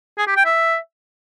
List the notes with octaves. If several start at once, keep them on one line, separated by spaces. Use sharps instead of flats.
G#4
G4
G5
E5